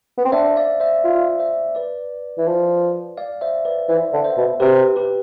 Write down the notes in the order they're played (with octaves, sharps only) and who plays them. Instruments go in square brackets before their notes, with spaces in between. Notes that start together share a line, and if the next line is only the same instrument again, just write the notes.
[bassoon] B3
C4
[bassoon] D4 [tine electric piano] C5 E5
[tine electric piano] D5 F5
C5 E5
[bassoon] F4
[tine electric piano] C5 E5
B4 D5
[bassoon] E3
F3
[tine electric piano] D5 F5
C5 E5
B4 D5
[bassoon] E3 [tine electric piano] C5 E5
[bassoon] D3
[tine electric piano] F5
C5 E5
[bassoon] B2
[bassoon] C3 [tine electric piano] G4 B4
[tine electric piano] G4 B4